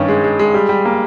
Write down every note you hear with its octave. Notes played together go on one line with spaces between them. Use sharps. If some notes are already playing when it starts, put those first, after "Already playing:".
Already playing: G2 D#3 C#4
G#3
G#3
G#3
G3
G3
A#3